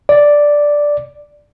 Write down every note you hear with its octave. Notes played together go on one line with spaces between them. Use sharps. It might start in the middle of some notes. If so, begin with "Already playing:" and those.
D5